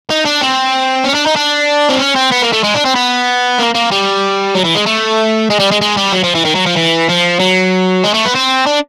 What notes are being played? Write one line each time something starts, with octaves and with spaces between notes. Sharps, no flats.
D#4
D4
C4
C#4
D4
D#4
D4
C4
C#4
C4
B3
A#3
A3
G#3
D4
C4
B3
A#3
A#3
G3
F#3
E3
G#3
A3
G#3
G3
G#3
G#3
G3
F#3
F3
E3
D#3
F#3
F3
E3
F3
F#3
G#3
A3
B3
C4
D4